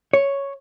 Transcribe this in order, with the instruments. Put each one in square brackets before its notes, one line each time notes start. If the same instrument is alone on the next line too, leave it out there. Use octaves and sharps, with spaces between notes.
[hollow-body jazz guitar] C#5